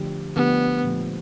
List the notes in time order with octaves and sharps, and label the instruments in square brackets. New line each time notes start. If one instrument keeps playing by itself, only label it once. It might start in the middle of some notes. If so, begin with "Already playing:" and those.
Already playing: [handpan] D3 F3 A3 D4 G4
[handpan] D3 F3 A3 D4 G4 [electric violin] B3
[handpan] A#2 F3 A3